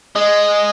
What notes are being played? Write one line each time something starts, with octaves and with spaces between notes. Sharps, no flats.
G#3 D#5